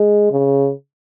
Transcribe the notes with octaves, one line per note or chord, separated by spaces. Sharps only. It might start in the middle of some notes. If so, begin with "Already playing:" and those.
Already playing: G#3
C#3